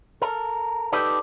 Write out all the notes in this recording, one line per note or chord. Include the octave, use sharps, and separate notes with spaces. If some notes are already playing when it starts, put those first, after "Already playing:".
A4 A#4
D#4 G4 A4 B4 D5